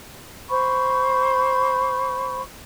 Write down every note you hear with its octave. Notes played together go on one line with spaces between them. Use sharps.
C5 B5 C#6